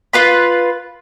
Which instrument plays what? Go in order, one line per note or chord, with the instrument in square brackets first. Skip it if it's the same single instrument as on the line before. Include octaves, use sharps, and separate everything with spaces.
[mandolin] F4 B4 B5